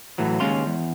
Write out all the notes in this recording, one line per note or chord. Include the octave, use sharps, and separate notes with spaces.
A2 E3 F#3
D#2 G#3 C#4 F5 C6
E2